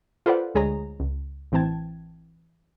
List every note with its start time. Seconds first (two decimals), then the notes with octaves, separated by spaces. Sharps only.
0.26 F4 A4 B4 C5 D5 F#5
0.55 D2 G#3 G#4 C#5 A#5
1.00 C#2
1.52 A1 E3 C4 G5 A5 G#6